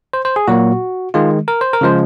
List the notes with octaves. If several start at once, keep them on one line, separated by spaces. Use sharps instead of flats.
C5
C5
G#4
A#2 F#3 A#3 F#4
D#3 G#3 F4
A#4
C5
A#4
C#3 F3 G#3 C5